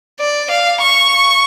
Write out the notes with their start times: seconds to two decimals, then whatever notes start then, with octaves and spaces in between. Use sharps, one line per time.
0.20 D5
0.51 F5
0.81 C#6